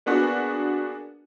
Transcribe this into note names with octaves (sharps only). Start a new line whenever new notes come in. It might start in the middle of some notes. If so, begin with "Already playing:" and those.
A#3 B3 D4 F#4 G#4 B4